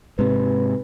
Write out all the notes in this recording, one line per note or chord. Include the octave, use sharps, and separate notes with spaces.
G#2 C3 B4